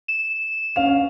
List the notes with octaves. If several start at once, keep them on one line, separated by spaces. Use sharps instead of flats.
E7
C#4 F5 F7